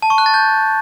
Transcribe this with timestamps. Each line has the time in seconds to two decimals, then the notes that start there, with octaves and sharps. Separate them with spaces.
0.02 A5
0.10 C#6
0.18 F#6
0.26 A6
0.34 G6